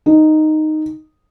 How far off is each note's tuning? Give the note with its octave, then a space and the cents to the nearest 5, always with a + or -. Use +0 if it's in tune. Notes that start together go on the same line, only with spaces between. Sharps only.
D#4 -5